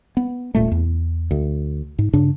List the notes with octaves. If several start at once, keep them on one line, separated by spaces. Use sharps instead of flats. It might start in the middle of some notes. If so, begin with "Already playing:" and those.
B3
D#1 A#2 A3
E2
D2
G#2
G2 C#3 D4